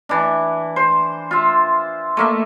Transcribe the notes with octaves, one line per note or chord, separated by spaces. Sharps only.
E3 D4
C5
F4 E5
A3 A#3 E5